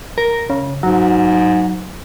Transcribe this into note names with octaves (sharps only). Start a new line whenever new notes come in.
A#4
C#3
G#2 F#3